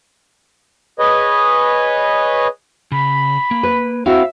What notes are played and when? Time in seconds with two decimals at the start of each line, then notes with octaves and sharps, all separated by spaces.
0.99 G#4 B4 C#5 D#5
2.92 C#3 B5
3.51 A#3
3.63 B4
4.06 C4 E4 F#4 E5 F5